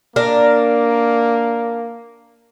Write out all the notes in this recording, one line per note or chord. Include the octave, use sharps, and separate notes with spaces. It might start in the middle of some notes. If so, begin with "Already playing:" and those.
A#3 D4 A#4